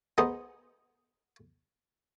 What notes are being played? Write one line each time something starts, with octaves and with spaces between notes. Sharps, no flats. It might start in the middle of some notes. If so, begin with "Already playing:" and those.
B3 D#4 G#4 C5 D#5